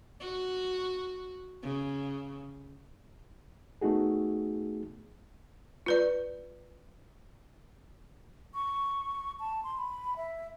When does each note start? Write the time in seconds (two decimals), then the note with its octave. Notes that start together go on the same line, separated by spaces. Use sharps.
0.20 F#4
1.63 C#3
3.81 A3 B3 D#4 F#4 G#4
5.86 F4 B4 D5
8.54 C#6
9.40 A5
9.64 C6
9.78 B5
10.17 E5